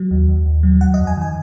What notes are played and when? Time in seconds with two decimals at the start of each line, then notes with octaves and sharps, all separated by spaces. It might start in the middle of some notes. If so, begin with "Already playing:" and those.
Already playing: F#3
0.11 D#2
0.29 D#2
0.46 D#2
0.63 F#3
0.81 F#3 F#5
0.94 D#5
0.99 F2
1.07 G#5
1.17 D#3 G#5